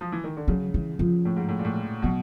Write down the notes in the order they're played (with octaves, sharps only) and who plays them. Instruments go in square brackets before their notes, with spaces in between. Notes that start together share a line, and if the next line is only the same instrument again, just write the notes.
[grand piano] F3
E3
D#3
D3
[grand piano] C#3 [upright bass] F#3
[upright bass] E3
F3
[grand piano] A2
G#2
A2
A#2
A2
[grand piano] B2 [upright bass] F#3